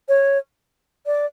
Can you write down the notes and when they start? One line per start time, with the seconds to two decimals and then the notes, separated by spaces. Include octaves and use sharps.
0.09 C#5
1.06 D5